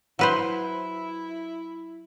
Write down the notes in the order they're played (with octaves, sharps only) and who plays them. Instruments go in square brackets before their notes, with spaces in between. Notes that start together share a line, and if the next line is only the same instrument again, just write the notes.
[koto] F#3 B4 C5 [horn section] E4